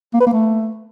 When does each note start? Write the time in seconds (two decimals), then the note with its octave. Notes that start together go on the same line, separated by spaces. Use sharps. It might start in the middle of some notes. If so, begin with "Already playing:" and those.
0.14 A#3
0.20 B4
0.27 A#3
0.33 A3